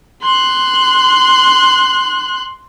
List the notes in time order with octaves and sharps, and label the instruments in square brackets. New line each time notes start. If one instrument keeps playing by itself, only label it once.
[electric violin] C6 F#6